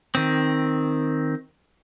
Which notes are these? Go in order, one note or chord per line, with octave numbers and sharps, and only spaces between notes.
D#3 C4